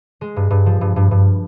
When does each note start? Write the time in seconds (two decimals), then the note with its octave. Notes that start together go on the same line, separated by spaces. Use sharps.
0.21 G#3
0.36 G2
0.50 G2
0.66 F3
0.81 G2
0.96 G2
1.11 G2